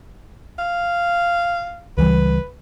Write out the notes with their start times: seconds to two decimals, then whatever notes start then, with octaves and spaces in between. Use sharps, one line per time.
0.58 F5
1.98 C#2 E3 G3 B4